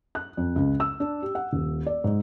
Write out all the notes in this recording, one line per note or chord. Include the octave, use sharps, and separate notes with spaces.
F#6
F2
C#2
E6
D4
G4
F#5
D#1
D5
G#2